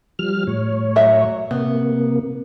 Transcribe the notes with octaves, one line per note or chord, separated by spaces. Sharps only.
F3 G3 F6
A2 C#5
F#3 E5
C3 A#3 B3